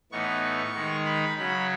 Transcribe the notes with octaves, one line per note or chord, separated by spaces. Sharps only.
A2 E3 B3 D#4 C#6
D#3 G#3 D#4
B5
C#3 F#3 C#4 B5